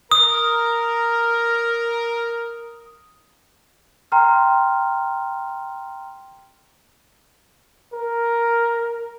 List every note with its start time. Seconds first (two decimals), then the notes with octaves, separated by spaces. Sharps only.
0.11 A#4 D#6
4.12 G5 A#5 C6 F6
7.93 A#4